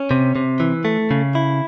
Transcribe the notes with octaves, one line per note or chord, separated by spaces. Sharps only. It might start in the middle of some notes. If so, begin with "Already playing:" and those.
Already playing: C#4
C3
C3
E3
A3
C#3
E4